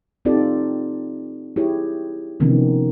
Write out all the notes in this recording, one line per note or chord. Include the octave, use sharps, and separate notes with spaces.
C4 D#4 F4 G4 A4 D5
E4 G4 G#4 C#5
C3 D#3 F3 B3 C#4 D#4